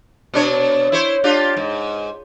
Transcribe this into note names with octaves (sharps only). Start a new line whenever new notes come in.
B2 D4 C#5
E4 C5 C#5
D4 F4 G4
G#2